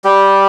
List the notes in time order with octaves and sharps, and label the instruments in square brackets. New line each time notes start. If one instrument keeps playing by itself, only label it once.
[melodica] G3 G4